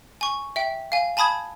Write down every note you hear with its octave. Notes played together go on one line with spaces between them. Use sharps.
G#5 C#6
E5 G5
F5 G#5
G#5 A5 B5 D#6 G#6